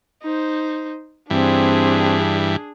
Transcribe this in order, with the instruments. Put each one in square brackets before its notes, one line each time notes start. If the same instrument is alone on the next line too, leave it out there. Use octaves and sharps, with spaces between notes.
[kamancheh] D#4 C5
[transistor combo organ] G2 E3 [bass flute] C4 [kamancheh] D4 G#4